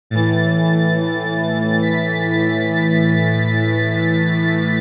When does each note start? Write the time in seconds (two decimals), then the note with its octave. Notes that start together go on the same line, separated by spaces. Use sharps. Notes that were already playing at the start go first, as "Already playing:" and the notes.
0.10 A2 E3 A6
1.82 B6